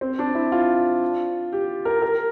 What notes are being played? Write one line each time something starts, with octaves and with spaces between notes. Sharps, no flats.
C4
D4
E4
F4
G4
A#4
A#4